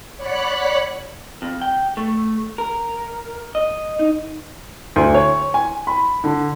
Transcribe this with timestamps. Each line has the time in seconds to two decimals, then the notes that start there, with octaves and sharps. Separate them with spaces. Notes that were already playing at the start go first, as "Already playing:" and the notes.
0.17 C#5 D5 F#5 B5 F#6
1.42 F2
1.61 G5
1.97 A3
2.58 A#4
3.55 D#5
3.99 D#4
4.96 D2
5.14 C#5
5.54 G#5
5.87 B5
6.24 D3